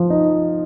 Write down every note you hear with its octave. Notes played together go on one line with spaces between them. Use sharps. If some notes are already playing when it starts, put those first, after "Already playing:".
Already playing: F3
D#4